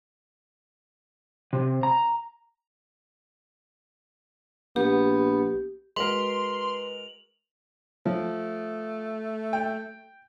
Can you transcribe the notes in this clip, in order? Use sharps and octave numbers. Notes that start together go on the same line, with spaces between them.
C3
A#5
A#1 B3 G4
G#3 F#4 A#4 B4 C6 F7 F#7
F3 A3
G5